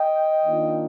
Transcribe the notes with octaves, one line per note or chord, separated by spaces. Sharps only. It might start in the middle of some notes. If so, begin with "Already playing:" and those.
Already playing: D#5 G5
D#3 A#3 D4 F4